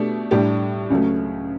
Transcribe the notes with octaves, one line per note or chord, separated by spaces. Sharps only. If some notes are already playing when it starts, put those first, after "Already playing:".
Already playing: B2 A3 D4 G4
A2 G3 D4 G4
C#2 C#3 F#3 A3